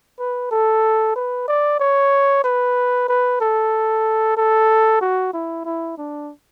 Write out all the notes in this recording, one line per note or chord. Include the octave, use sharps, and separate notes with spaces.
B4
A4
B4
D5
C#5
B4
B4
A4
A4
F#4
E4
E4
D4